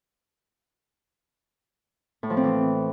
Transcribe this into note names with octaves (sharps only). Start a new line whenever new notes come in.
A2
F3
C4
E3